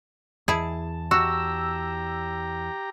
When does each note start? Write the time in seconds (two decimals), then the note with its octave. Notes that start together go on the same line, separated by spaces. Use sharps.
0.48 E2 E4 G#4 A5
1.11 F#4 G4 A#5 E6